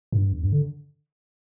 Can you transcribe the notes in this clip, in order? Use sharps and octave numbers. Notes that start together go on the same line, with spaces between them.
G2
E2
G2
D3